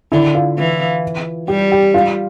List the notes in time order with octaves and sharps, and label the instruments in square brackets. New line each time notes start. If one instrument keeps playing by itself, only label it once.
[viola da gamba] D3 [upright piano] E4
[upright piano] F4
[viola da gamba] E3
[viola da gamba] G3 [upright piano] G4
[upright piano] G4
F4